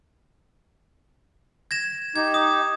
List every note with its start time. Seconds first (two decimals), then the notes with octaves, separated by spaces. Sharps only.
1.71 G#6 A#6 E7
2.16 D#4 G4 G#6
2.34 D#6